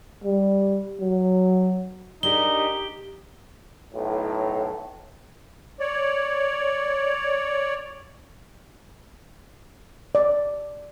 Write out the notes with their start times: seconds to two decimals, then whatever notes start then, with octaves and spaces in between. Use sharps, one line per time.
0.24 G3
1.00 F#3
2.23 D4 D#4 G4 G#4 A#4 G7
3.94 B1 A2
5.80 C#5 D5
10.15 D5